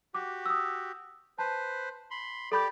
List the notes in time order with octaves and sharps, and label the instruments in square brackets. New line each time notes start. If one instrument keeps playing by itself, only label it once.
[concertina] F#4 G4 [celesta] D6
[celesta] D#6 E6
[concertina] B4 C5 [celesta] A5
[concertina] B5 C6
[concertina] G4 D5 [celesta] A4 B5 G6